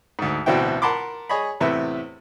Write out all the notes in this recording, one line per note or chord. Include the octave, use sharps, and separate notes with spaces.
D2 G#2
A1 D2 B2 C4 E4 G5
A#4 F#5 A5 B5 C6 D6
G#4 C#5 D#5 B5
E2 A2 C3 B4 E5